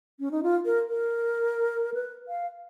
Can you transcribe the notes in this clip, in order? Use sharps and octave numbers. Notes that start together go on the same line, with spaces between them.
C#4
D#4
F4
A#4
A#4
B4
F5